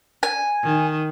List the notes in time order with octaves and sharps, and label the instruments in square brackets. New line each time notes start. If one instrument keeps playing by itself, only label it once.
[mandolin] G#5
[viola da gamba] D#3